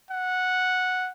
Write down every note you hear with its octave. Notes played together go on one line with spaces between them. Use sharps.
F#5